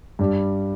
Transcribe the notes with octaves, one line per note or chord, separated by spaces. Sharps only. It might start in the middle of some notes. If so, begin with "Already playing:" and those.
G2 G3